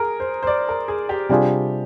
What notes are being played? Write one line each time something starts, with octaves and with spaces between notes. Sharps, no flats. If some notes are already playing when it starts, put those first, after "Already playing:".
Already playing: G#4 A#4
C5
C5
D5
A#4
G#4
G4
C3 G3 D4 F4 G4 G#4